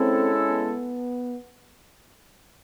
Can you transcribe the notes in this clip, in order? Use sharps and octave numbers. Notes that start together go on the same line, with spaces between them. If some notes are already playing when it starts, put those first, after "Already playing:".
Already playing: G#3 C4 C#4 E4 A4
B3